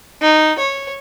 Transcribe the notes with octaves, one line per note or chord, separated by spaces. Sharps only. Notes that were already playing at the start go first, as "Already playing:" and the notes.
D#4
C#5